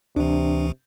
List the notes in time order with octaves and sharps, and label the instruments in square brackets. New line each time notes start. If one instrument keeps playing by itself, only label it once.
[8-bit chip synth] D2 E3 [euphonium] C3 [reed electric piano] D4